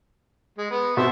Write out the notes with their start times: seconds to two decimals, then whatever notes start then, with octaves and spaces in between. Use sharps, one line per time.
0.58 G#3
0.70 B3
0.97 B2 C5 E5